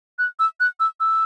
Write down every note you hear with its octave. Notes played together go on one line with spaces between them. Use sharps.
F#6
E6
F#6
E6
E6